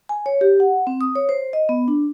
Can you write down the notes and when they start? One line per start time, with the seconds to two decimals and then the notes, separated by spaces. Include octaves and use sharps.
0.09 G#5
0.26 C#5
0.41 G4
0.60 F#5
0.87 C4
1.01 D#6
1.16 C#5
1.29 C5
1.53 D#5
1.69 B3
1.88 D4